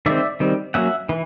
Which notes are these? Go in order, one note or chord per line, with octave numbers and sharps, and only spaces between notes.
D#3 G#3 C4 D5 E5
D#3 G3 C4
F#3 A#3 C#4 E5 F#5
E3